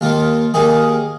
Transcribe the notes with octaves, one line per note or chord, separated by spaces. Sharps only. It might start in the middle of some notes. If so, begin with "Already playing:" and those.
D#2 D#3 A#3 F4
D#2 D#3 A#3 G#4